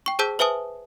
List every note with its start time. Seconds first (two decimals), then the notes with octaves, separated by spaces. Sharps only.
0.06 G5 C#6
0.19 G#4 C5 A5 E6 G6 B6
0.39 B4 C5 E5 G#5 A5 D#6